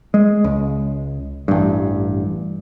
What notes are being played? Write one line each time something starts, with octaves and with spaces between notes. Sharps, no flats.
G#3
C#2
A1 G2